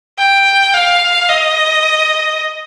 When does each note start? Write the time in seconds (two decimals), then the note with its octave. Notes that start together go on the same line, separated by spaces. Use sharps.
0.18 G5
0.74 F5
1.29 D#5